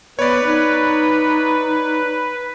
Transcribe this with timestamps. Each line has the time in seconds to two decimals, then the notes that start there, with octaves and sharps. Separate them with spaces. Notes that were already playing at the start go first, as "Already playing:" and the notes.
0.19 B3 B4 C#5 D5
0.45 D#4